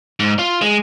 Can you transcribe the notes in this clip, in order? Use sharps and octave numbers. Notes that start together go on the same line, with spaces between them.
G#2
F4
G#3